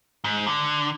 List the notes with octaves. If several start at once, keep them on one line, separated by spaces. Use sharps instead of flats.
G#2
D3